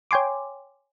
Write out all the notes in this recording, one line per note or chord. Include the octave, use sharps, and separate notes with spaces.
C#5 G5 G#5 C6 D6